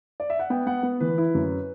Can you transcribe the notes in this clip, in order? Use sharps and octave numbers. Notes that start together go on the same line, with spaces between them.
D5
E5
F#5
B3 G5
B3 F#5
B3
E3 B4
E4
F#2